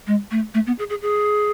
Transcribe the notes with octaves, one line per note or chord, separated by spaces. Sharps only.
G#3
A3
A3
B3
G#4
G#4
G#4